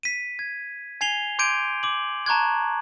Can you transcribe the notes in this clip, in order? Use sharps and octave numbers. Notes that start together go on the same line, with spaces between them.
B6 D#7
G#6
G#5 G#6 C7 F7 G7
C6 D6 G6 G#6 D7 D#7
D6 F#7
A5 A#5 C#6 F#6 G#6